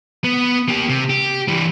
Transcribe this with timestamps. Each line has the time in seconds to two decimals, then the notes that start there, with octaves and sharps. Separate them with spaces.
0.24 B3
0.69 A#3 G4
0.89 C3
1.10 G4
1.48 E3 G3